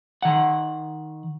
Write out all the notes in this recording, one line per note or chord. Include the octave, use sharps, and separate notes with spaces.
D#3 F#5